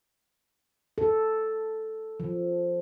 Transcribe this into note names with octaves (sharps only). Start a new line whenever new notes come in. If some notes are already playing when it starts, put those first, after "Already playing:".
A4
F3